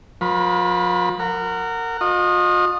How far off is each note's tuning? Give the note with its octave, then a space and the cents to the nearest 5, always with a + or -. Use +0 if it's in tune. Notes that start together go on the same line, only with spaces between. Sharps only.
F3 +35 A#4 +45 B5 +0
A#4 -20 F#5 +0
F4 +40 D#5 -15